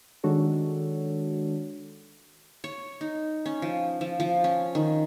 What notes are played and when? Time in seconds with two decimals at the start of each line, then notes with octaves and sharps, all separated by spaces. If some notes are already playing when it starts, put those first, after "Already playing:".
0.23 D#3 G#3 D4 F#4 A4 C#5
2.64 C#5
3.01 D#4
3.46 C#4
3.62 F3
4.01 F3
4.20 F3
4.44 C#4
4.75 D#3